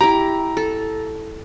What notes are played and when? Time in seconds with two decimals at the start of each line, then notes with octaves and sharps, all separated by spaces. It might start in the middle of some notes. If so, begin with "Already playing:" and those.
0.01 E4 G4 A#5
0.57 A4